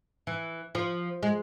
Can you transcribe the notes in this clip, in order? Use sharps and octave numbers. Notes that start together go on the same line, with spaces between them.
E3
F3
G#3